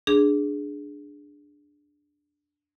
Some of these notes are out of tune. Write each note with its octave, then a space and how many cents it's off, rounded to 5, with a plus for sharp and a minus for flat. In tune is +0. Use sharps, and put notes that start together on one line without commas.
D4 +0 G#4 +0